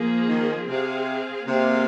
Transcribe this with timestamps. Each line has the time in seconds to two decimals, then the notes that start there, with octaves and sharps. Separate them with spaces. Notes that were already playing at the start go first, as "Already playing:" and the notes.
Already playing: F3 A#3 G#4
0.28 D#3
0.67 C3 C4 G#4 F5
1.47 C3 A#3 F4 G#4 F5